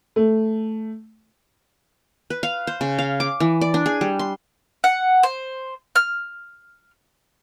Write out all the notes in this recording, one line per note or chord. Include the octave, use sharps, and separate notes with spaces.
A3
B4
F5
C5
C#3
F5
D6
E3
D5
D4
G#4
G3
C6
F#5
C5
F6